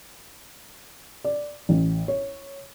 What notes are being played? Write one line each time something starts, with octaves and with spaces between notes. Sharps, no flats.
D5
A1
C#5